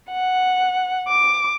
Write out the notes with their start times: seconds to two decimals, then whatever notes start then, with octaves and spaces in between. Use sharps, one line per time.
0.12 F#5
1.08 D6